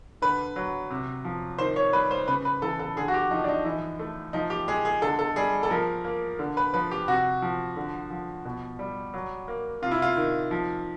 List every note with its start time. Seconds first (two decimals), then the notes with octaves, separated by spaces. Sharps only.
0.22 D3 B4
0.56 F#3
0.90 C3
1.25 F3
1.58 D#3 C5
1.76 C#5
1.93 G3 B4
2.11 C5
2.28 C#3 B4
2.45 B4
2.62 E3 A4
2.80 A4
2.96 D3 G#4
3.08 F#4
3.14 G4
3.30 F3 D#4
3.44 D4
3.48 D#4
3.65 E3 D#4
3.99 A3
4.33 F3 D#4
4.50 G4
4.68 G#3 G#4
4.85 G#4
5.02 D3 A4
5.19 A4
5.36 G3 G#4
5.63 A4
5.71 F3 A#4
6.05 A#3
6.39 D3
6.57 B4
6.74 F3 B4
6.91 G4
7.08 C3 F#4
7.42 F3
7.76 D3
8.10 F3
8.45 B2
8.79 G3
9.14 F#3
9.48 A#3
9.82 C3 F4
9.91 E4
10.02 F4
10.17 D#3
10.51 F3